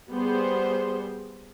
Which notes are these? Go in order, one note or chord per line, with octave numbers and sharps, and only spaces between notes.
G3 B3 G#4 C5